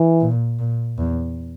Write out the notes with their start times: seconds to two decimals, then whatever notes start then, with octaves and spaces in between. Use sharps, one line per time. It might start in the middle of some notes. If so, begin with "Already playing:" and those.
Already playing: E3
0.21 A#2
0.59 A#2
0.98 E2